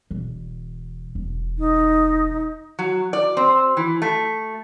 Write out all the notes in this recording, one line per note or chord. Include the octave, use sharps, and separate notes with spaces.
E1
E1
D#4
F#3
D5
C4
E3
A3